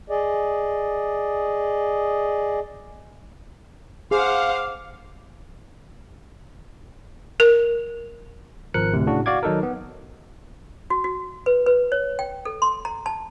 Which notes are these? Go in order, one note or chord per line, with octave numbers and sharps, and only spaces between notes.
G#4 D5 D#5
G#4 C5 F5 F#5 D6
A#4
G#1 F3 A#4 F#6 C#7
D2 A2 C3
A2 C#3 D4 F#4
F#4 D5 F5 D6 G#6
D#3 F#3 D#4 A4 A#4
B3
F#4
F#4
B4
B4
C#5
G5
A4
C6
A#5
A5